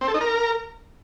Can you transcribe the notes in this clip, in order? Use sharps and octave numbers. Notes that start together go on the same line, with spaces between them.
C4
A4
D#4
A#4